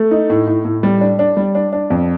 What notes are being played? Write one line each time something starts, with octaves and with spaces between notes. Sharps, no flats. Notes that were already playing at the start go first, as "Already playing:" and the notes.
Already playing: A3
D#4
A2
A2
A2
G3
D4
D4
G3
D4
D4
F2